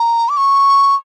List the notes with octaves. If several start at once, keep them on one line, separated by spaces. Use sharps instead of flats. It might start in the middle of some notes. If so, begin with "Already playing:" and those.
Already playing: A#5
D6
C#6